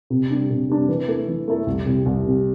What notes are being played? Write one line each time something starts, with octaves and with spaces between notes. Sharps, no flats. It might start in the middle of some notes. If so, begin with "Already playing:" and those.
C3
G3 D4
C3
G3 D4
E3
A3 E4 A4
E3
A3 E4 A4
C2
C3 G3
C2
C3 G3